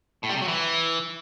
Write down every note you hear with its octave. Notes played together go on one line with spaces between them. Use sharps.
A2
G3
C3
F#3
E3